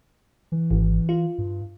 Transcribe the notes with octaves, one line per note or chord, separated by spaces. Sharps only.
E3
G#1
F4
G2